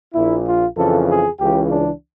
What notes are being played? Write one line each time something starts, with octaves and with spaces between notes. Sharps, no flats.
A#1 A#2 E4
F4
F2 C#3 E3 A4
G#4
C#2 C#3 E3 G4
D4